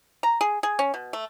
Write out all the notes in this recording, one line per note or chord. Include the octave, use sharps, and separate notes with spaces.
A#5
G#4
G#4
C#4
B2
A3